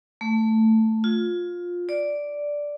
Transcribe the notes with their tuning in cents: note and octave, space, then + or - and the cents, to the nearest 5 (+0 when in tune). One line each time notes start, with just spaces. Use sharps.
A3 +10
F4 +15
D5 -5